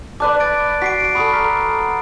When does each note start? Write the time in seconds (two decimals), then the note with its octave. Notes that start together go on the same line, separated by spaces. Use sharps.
0.20 B4 D5 A5 D6 F#6
0.40 A6 D7
0.82 F#4 B6 C7 D7
1.15 A4 B5 C#6 D#6
1.33 A#5 F6 B6